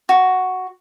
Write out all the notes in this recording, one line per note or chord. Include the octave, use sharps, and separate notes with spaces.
F#4